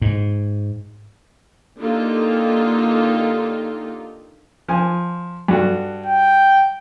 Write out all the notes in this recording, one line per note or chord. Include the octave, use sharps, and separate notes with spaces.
G#2
D3 A#3 D#4 F4 G4 A4
F3 G#5
G2 F#4 A4
G5